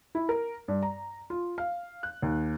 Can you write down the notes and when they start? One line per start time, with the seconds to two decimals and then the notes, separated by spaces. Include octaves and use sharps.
0.15 E4
0.29 A#4
0.68 G2
0.82 A#5
1.30 F4
1.58 F5
2.03 F#6
2.22 D#2